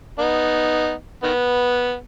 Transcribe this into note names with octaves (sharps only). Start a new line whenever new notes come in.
B3 D#4
D#3 B3